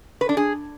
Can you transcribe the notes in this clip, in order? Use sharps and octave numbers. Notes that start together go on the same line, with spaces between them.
B4
D4
G#4